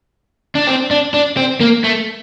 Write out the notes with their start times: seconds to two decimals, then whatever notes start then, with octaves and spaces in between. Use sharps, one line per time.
0.55 D4
0.67 C4
0.91 D4
1.14 D4
1.37 C4
1.61 A#3
1.84 A3